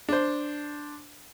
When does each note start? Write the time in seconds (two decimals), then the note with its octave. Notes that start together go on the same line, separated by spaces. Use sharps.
0.09 D4 C5